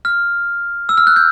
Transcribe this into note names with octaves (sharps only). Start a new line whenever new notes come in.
F6
E6
F6
F#6
G6